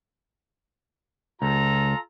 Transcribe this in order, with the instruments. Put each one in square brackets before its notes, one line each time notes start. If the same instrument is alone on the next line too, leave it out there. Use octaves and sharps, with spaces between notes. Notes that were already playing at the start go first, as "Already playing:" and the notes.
[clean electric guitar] C#2 [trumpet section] F4 A4 A#5